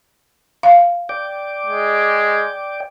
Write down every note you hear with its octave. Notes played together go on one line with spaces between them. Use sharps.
F5
D5 G5 D6
G#3